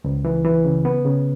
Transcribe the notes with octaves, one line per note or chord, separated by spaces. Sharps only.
C#2
E3
E3
C#3
B3
C#3